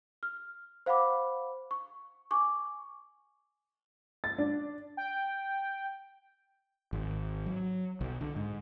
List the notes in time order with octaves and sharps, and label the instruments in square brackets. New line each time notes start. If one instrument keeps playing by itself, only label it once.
[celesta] F6
C5 F5 F#5 B5 D6
C#6
G#5 C#6 D6
[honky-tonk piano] A6
D4
[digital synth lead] G5
[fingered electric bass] G#1
F#3
B1
D3
G#2